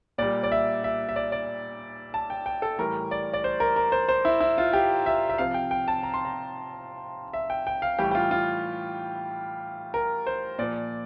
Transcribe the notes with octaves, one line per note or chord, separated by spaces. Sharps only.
A#2 G3 D5
D5
E5
E5
E5
D5
D5
A5
G5
G5
A4
A2 E3 G3 A#4
D5
D5
C5
A#4
A#4
C5
C5
E4
E4
F4
G4
E5
E5
C3 F3 F5
G5
G5
A5
A#5
C6
A#5
E5
G5
G5
F5
A2 E3 G3 G4
G4
F4
F4
A#4
C5
A#2 F3 D5